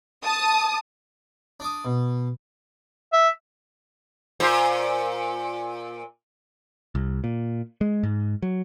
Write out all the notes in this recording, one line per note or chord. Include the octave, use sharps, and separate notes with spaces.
A5 D#6
D4 D6 D#6
B2
E5
A#2 C5
C2
A#2
G#3
G#2
F#3